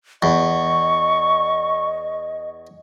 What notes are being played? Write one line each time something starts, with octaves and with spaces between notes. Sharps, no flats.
E2 D#5 C#6